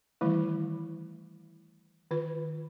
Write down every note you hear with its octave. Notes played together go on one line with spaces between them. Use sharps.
D#3 E3 G3 A3 E4
D#3 F4 B4